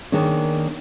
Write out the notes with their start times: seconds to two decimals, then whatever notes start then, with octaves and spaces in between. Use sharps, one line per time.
0.12 D#3 A#3 D4 G#4 C#5